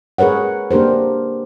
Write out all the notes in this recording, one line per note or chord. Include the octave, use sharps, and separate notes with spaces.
G#4 A#4 B4 C#5 F#5
A#3 D4 G4 A#4 C5